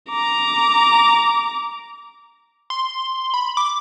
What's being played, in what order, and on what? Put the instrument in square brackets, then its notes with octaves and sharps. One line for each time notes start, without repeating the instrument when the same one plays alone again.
[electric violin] A#5 D6
[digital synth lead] C6
B5
D6